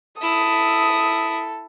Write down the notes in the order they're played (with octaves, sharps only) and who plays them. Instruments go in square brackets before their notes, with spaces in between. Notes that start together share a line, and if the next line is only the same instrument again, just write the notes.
[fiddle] E4 [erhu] A4 [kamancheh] D#6